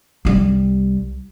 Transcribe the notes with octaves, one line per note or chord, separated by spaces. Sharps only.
C2 G3